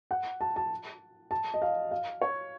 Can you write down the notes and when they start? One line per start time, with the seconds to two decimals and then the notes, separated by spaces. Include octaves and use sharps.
0.11 F#5
0.41 A5
0.56 A5
1.31 A5
1.54 D#5
1.62 F5
1.91 F5
2.21 C#5